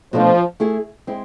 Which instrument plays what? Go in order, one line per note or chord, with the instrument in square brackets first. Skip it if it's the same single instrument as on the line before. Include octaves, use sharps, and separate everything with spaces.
[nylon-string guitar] B2 A3 D4 [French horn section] F3
[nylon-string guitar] A3 E4 G#4
G#3 C4 E4